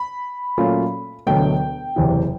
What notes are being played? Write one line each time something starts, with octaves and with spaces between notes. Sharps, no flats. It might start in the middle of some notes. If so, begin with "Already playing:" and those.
Already playing: B5
A#2 F#3 A3 C#4 F4
E1 D2 D3 F#3 A3 G5
F#1 E2 C3 E3